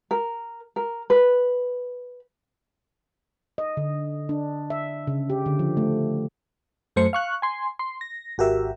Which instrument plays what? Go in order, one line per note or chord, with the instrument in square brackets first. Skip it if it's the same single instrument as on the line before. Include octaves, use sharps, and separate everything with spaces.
[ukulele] A#4
A#4
B4
[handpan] D#5
D3
D4
E5
C#3
G4
D3
F3
A3
[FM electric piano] F#2 A3 C5 C#7
F5 C#6 F#6
G#5 C6
C6
A#6
G#1 F#4 G4 A#4 E5